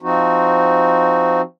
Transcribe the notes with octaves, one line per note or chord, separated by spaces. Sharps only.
F3 C4 D#4 F#4